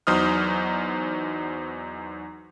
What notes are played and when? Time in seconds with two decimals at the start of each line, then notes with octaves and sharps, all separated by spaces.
0.07 E2 F#3 D#4 C5 D#6 F6